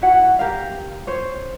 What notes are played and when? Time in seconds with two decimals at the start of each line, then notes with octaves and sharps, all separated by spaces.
0.02 E4 F#4 F#5
0.39 G4 A#4 F5
1.07 C5 C#5